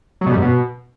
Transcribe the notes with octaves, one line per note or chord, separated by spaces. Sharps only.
F#3
B2
G3
F#2
B2